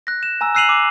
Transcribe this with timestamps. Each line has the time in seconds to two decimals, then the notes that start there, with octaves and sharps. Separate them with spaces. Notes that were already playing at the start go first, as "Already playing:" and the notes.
0.07 F#6 A#6
0.23 E7
0.41 G#5 A#5 E6
0.55 E6 F#6 C7 D#7 F7 F#7
0.69 D6